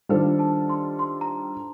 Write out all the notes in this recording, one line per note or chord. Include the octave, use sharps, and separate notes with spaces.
D#3 G3 D4 F4 A4 C5
A5
C6
C6
A#5